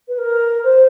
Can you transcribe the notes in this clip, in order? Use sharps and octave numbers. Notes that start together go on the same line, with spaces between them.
B4
A#4
C5